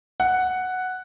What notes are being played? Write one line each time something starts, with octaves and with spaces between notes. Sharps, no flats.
F#5